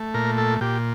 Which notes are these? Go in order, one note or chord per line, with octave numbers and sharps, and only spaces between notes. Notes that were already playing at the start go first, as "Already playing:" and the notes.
Already playing: A3
A#2 A#4
A4
A#2 G4